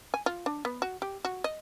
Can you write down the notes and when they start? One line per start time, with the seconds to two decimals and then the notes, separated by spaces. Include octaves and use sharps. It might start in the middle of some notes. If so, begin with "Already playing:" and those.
0.14 G#5
0.26 F4
0.46 D4
0.65 B3
0.82 F#4
1.02 G4
1.25 F#4
1.44 D#5